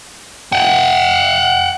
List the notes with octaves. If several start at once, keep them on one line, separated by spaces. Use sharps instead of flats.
F#5 G5